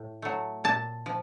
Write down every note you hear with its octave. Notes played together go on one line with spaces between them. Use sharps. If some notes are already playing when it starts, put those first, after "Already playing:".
Already playing: A2
F#3 A3
A#2 A5
F3